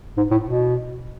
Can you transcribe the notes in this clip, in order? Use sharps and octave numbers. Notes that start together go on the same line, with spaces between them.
G#2
A2
B2